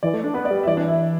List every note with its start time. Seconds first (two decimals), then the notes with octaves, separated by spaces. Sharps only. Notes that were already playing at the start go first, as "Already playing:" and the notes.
0.03 E3 D5
0.14 A3
0.24 D4
0.34 B3 B4
0.45 D5
0.51 G3
0.63 E5
0.67 E3 D5
0.77 D4
0.88 E4